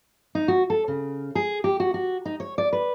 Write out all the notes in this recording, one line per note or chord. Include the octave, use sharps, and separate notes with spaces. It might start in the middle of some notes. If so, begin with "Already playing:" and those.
D#4
F#4
A4
C#3
G#4
G4
F#4
F#4
D#4
C#5
D5
B4